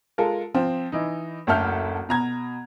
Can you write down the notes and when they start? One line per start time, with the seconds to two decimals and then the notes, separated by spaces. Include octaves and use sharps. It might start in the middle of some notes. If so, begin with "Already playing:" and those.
0.18 G#3 F4 A4 A#4
0.54 F3 C4
0.92 E3 D#4
1.47 F#1 D2 A4 E5 F6 G6
2.09 B2 A#5 G#6